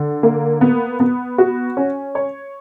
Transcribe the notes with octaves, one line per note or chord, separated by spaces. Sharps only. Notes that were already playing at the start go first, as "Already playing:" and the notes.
Already playing: D3
A#3
B3
B3
F#4
C#4
C#5